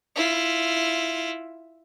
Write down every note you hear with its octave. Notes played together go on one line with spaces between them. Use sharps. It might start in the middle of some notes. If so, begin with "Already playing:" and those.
E4 F4